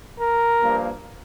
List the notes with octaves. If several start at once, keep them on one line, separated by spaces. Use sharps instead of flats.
A#4
G2 F3 A#3